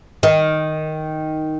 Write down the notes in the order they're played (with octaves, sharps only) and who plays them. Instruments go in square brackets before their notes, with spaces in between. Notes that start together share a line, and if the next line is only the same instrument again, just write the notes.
[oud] D#3